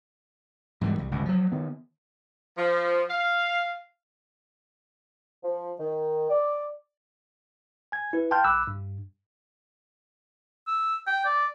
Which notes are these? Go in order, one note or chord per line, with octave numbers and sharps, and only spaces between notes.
G#2 E3 F#3 G3
C2
G1 C#2
F3 F#3
D#3 B3
F3
F5
F3
D#3
D5
G#5 G#6
E4 B4
F5 G5 A5 C6 F6 G6
B1 B5 D6 E6 F#6
G2
E6
G5
D5